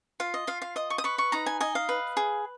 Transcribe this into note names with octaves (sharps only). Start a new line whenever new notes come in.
F4 F5
D#5
F4 F5
F5
D#5 D#6
C#6
D#6
B4 C#6
C#6
D#4 A#5
G#5
D#5 G#5
F5
B4
G#4